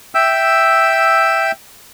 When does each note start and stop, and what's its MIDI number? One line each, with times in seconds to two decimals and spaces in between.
0.15 1.52 76
0.15 1.52 79
0.15 1.52 88